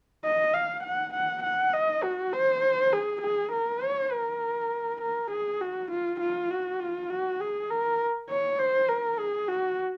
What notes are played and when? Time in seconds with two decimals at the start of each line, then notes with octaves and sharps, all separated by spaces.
0.24 D#5
0.54 F5
0.83 F#5
1.14 F#5
1.43 F#5
1.74 D#5
2.03 F#4
2.33 C5
2.93 G#4
3.22 G#4
3.52 A#4
3.82 C#5
4.12 A#4
5.01 A#4
5.31 G#4
5.61 F#4
5.91 F4
6.20 F4
6.51 F#4
6.80 F4
7.10 F#4
7.40 G#4
7.70 A#4
8.29 C#5
8.58 C5
8.89 A#4
9.19 G#4
9.48 F#4